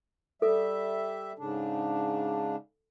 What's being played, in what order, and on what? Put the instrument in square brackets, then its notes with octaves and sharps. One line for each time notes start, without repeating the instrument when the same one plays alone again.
[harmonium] G3 E5 [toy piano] A4
[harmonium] G#2 C#3 D4